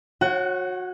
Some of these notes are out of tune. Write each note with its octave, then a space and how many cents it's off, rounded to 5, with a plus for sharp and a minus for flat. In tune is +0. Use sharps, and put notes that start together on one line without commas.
F#4 -20 C#5 -25 F#5 +25